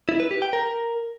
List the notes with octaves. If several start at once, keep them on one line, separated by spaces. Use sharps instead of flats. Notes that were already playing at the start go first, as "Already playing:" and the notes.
E4
B4
G4
G5
A#4